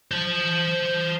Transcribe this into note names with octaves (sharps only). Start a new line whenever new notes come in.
C5 A5